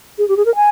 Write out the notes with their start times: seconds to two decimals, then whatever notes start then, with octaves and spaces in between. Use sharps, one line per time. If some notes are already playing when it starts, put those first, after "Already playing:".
0.18 G#4
0.28 G4
0.37 G#4
0.46 A#4
0.55 G#5